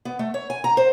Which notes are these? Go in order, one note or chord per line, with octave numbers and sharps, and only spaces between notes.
B3
A3
C#5
G#5
A#5
C5